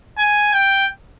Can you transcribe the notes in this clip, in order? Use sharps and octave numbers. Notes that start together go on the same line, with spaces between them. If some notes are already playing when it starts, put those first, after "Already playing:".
G#5
G5